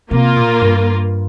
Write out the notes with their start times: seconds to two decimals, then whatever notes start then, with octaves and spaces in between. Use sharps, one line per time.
0.11 C3 A#3 F4 A#4
0.36 A#2
0.61 G2